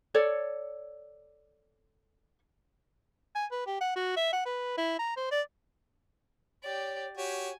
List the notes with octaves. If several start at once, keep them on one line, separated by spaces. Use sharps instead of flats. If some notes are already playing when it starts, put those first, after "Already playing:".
A4 C#5 D5
G#5
B4
G4
F#5
F#4
E5
F#5
B4
E4
A#5
C5
D5
G4 C#5 D5
F#4 G4 C#5 G#5